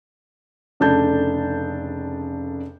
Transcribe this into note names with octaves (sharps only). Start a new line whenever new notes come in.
F1 C#3 D4 A4 A5 G6